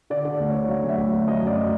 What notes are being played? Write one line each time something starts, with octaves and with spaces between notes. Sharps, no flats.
D3 D5
D3 D5
D2
D3 C#5
F#3 F5
D2
E5
D2
D2
F#3 D#5
F#2 D5
F#3